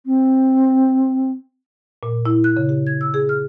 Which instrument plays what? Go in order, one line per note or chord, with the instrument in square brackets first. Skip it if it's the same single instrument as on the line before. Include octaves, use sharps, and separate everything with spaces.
[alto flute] C4
[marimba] A#2
E4
F#6
C#3
G4
G#6
E6
G#4
F6